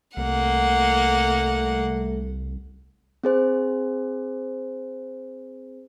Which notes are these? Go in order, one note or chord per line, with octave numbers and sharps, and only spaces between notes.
C2 A3 A#3 F#5
C4 G#4 C5